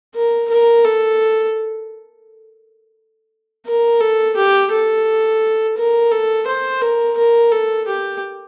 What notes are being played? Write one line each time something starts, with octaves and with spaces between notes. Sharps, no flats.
A#4
A#4
A4
A#4
A4
G4
A4
A#4
A4
C5
A#4
A#4
A4
G4